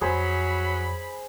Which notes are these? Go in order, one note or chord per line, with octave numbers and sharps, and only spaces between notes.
F2 F#3 G#4 C5 B5